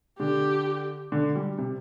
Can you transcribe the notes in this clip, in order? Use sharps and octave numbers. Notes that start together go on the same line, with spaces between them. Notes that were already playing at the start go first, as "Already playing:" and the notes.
D3 G4
D3
G3
C3